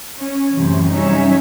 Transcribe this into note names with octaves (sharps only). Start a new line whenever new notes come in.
C#4
F#2 A2 C3 E3
F#3 G3 C#4 D#4 C#5 E5